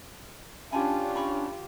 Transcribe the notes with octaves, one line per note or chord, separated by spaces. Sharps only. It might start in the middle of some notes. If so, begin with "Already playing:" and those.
C#4 D4 F4 G4 G#5 A5 B5
A#5 B5 C#6